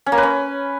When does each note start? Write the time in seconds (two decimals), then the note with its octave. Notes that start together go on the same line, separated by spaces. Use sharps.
0.06 C#4
0.12 A#3
0.18 B4
0.23 C#4